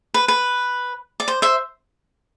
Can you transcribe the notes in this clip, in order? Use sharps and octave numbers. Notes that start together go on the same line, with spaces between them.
B4
B4
D5
C5
C5 E5